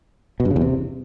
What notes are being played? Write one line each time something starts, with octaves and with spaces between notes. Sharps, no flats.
B2
G2
C#3
E2
C3